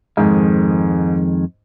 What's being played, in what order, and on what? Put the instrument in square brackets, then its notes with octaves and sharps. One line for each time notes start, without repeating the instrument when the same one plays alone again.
[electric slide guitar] F2 D#3 G#3 [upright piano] G#2